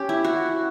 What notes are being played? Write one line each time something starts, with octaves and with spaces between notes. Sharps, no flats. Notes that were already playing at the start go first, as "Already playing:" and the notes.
Already playing: C#4 G4
E4
F#4